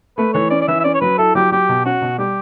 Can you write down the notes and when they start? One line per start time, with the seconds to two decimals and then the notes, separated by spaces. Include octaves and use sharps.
0.18 A3 B4
0.34 E3 C#5
0.50 C#4 D5
0.61 D5
0.68 E3 E5
0.80 E5
0.84 C#4 D5
0.94 C#5
1.01 F#3 B4
1.18 E4 A4
1.35 F#3 G4
1.52 F#3 G4
1.69 B2
1.85 C#4 F#4
2.02 B2
2.18 G3 G4